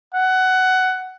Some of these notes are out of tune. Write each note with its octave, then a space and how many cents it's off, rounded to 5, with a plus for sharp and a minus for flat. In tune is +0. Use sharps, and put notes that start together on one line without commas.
F#5 +15